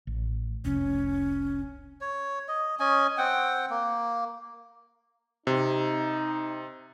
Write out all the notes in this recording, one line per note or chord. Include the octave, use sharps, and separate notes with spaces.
A1
F1 C2 C#4
C#5
D#5
C#4 D#5 G#5
C4 F#5 G5
A#3
C3 D#4